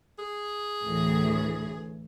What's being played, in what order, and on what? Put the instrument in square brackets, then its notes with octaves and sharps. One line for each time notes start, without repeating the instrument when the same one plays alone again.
[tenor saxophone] G#4
[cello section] D2 A2 E3